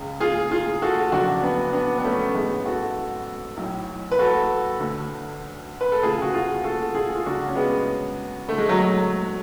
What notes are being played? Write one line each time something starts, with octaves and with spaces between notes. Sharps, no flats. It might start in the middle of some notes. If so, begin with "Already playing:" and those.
Already playing: C#2 C#3
F4 G#4
F4 G#4
F#4 A4
F#1 F2 C#3 D4 F#4
B3 D4
B3 D4
B3
A3 C#4
A1 G#2 G#3 B3
F#4 A4
B1
A2
B4
F#4 A4
D2 D3
B4
A4
D2 C#3 F4 G#4
F#4
F4 G#4
F#4 A4
F4 G#4
F4
C#2 C#3 D4 F#4
C#4
G#3 B3
D2 D3 A3
G#3
F#3 A3
F#3